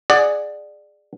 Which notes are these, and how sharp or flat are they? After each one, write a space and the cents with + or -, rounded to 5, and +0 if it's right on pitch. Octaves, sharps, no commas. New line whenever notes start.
G#4 +0 D5 +15 F#5 +0